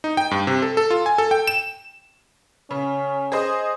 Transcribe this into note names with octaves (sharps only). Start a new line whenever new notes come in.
D#4
G5
G2
C3
A4
A4
F4
G#5
A4
G5
E7
C#3 C#4
G#4 C5 D#5